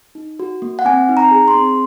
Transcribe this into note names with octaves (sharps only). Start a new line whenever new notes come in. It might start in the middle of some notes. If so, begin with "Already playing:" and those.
D#4
F#4
A#3
F#5
C4 G#5
D#4
A#5
G#4
C6
C4